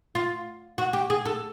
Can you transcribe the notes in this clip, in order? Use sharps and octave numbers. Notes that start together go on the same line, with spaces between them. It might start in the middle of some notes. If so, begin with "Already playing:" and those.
F4
F#4
G4
G#4
A4